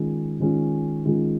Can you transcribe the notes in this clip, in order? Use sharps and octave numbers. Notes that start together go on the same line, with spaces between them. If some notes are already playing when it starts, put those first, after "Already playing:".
Already playing: D#3 G#3 C#4 F4
D#3 G#3 C#4 F4
D#3 G#3 C#4 F4